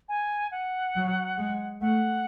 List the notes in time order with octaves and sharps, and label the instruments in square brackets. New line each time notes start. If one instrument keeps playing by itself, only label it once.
[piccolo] G#5
F#5
[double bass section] F#3
G#3
[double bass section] A3 [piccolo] F#5